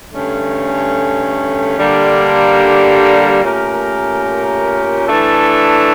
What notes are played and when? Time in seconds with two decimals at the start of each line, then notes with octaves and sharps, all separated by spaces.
0.14 G2 D3 A3 C#4
1.78 D3 G3 A#3
3.42 A#2 A3 C#4 G4 A#4
5.06 E3 A3 D4 A4